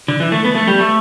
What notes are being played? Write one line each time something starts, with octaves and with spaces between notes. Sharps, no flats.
D3
E3
A3
B3
A3
G3
A3